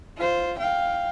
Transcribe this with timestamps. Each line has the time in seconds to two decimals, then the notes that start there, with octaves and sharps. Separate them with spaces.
0.17 F4 C5
0.58 F5 G5